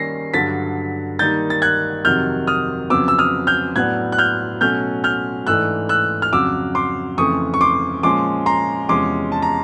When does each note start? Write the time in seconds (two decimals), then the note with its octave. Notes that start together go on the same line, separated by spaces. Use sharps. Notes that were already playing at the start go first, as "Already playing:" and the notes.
Already playing: D#3 G3 A#3 C#4 A#6 C7
0.34 G2 D3 F#3 A6 B6
1.19 D#3 G3 A#3 D#4 G6 A6
1.50 A6
1.62 F#6 G#6
2.05 F2 C3 D#3 F#3 F6 G6
2.47 D#6 F6
2.90 F2 C#3 F#3 B3 D6 E6
3.08 E6
3.19 D#6 F6
3.47 F6 G6
3.76 A2 F#3 B3 D4 F#6 G#6
4.12 F#6
4.18 F6 G6
4.61 B2 F#3 A3 C#4 F6 G6
5.04 F6 G6
5.47 G#2 E3 A3 D4 E6 F#6
5.89 E6 F#6
6.22 F6
6.33 F2 C#3 F#3 D6 E6
6.75 C6 D6
7.18 F2 C#3 E3 A3 C#6 D#6
7.54 C#6
7.61 C6 D6
8.03 A#2 F3 G#3 C#4 C6 D6
8.46 A#5 C6
8.89 E2 C3 F3 G#3 C#4 C6 D6
9.32 A5
9.42 A#5